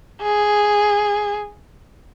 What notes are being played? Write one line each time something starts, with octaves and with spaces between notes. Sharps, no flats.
G#4